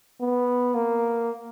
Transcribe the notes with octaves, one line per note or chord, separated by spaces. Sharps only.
B3
A#3